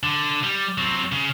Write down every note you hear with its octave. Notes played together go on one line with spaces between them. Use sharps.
D3
G3
F#3 C4
C#3